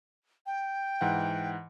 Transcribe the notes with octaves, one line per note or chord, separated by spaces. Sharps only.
G5
G#2 E3 F#5